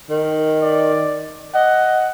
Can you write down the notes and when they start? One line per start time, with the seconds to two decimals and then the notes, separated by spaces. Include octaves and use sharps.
0.10 D#3
0.61 D5
1.55 D#5 F#5